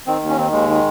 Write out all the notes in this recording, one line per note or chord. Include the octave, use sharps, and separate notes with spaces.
D#3 C4
D#2
C#4
D#3 C4
D#2 G#3
D#3